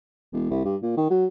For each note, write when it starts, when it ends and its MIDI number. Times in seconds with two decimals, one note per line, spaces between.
0.32 0.48 28
0.50 0.60 36
0.64 0.76 43
0.82 0.94 46
0.97 1.09 51
1.10 1.25 54